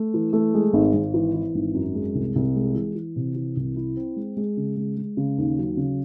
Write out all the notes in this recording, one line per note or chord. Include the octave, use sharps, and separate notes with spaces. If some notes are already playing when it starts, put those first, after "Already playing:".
Already playing: A3
E3
A3
G#3
G#1
G#1
E3
E3
G#1
F#2
G#3
C2
C2
G#3
E3
E3
C3
E3
C2
E4
C4
G#3
G#3
C#3
G#3
G#3
C#3
D#2
F#3
C#3